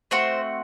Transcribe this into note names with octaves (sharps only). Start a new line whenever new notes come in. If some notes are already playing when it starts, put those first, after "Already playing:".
A3 C4 F#4 C5